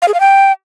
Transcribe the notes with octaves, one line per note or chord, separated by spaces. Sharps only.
F5
G#4
F5
G5